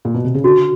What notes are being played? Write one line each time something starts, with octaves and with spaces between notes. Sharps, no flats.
A#2
B2
C3
C#3
D3 F#4